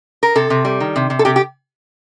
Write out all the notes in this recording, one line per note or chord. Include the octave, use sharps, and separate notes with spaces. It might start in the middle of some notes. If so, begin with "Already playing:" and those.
A#4
C3 A4
C3
G3
D#3
C3
C3
A4
C3 G4
G4